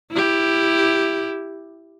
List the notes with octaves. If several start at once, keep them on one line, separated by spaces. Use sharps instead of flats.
E4 G4